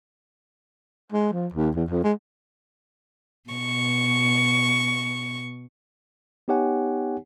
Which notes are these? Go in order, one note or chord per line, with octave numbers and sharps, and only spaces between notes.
G#3
F3
D#2
E2
F2
G#3
B2 C#6
B3 D#4 G4 C#5 F#5 G#5